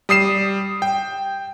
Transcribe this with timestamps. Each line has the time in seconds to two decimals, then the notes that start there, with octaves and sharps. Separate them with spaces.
0.09 G3 D#6 C7 E7
0.82 G5